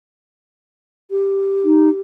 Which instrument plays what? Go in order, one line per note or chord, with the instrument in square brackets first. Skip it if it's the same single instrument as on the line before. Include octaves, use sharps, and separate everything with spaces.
[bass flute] G4
[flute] D#4